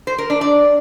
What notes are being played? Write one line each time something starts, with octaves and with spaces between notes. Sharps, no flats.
C5
A#4
D4
D5